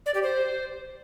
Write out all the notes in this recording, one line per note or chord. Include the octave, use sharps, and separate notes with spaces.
D5
G4
C5